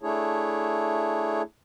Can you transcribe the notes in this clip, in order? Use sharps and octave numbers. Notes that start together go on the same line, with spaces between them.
A3 D4 E4 G#4 C#5